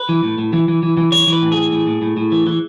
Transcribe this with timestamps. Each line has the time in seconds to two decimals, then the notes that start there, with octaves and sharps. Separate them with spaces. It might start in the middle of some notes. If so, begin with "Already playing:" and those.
Already playing: B4
0.09 E3
0.23 A2
0.38 A2
0.53 E3
0.68 E3
0.83 E3
0.97 E3
1.12 E3 C#5
1.27 E3
1.33 B4
1.42 A2
1.52 E3 G#4
1.72 A2
1.86 A2
2.02 A2
2.17 A2
2.32 E3
2.47 E3